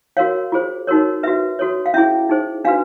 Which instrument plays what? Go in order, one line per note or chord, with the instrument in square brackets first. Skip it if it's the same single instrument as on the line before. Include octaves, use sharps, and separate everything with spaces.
[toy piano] F#4 A#4 C#5 F5
F4 G#4 C5
D#4 F#4 A#4 C#5
F#4 B4 E5
F#4 A4 C#5
F5
C#4 E4 G#4 E5
D#4 G#4 C5
D4 F#4 B4 F5